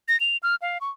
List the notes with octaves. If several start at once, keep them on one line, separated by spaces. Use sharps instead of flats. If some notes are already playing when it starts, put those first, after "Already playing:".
A#6
F7
F6
F5
C#6